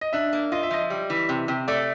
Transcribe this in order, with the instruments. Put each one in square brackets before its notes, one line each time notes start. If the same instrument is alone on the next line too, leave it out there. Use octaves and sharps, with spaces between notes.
[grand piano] D#5
[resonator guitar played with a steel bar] D4 [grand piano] E5
[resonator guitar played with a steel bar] A#3
[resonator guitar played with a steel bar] F4 [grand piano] D#5
[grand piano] E5
[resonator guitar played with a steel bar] F3 [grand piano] D#5
[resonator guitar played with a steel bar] G3
E3
C3
C3
[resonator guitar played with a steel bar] A3 [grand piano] D5